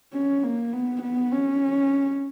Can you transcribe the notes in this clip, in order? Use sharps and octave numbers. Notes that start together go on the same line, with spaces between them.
C#4
A#3
B3
B3
C#4